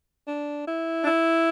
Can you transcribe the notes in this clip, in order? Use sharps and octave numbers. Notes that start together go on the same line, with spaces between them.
D4
E4
D4
E4